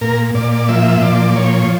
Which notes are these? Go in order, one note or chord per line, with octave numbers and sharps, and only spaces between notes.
A#2 A#4
A#2 D5
D5
F3 E5
A#2 D5
F3 C#5